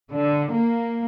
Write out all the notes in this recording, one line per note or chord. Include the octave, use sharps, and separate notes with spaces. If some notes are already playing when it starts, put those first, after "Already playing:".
D3
A#3